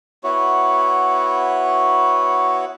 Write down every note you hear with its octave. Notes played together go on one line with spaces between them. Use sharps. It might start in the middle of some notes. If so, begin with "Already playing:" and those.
B3 E4 F#4 C#5